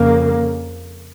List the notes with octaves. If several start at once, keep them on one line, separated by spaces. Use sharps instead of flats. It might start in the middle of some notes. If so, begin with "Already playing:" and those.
Already playing: F2 C#3 A#3